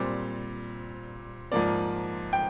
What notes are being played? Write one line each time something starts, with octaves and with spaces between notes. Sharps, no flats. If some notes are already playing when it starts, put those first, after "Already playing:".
Already playing: A#2 G3 C4 D5
G#2 F3 A#3 D5
G5